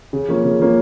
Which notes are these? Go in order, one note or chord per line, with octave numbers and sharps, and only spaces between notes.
C#3
F3 A#3 C#4
C#3
F3 A#3 C#4